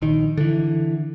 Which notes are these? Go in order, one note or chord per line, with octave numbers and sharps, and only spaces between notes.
A#1 D#3
D3 E3